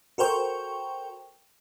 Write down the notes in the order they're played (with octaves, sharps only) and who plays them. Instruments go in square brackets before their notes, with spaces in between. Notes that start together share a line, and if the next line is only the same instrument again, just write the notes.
[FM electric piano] F#4 A4 A#4 C5 G5 C#6